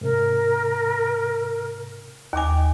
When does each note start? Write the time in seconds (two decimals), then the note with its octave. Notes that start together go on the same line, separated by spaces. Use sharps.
0.01 G#2 C3 A#4
2.33 D#2 D#5 G5 G#5 D6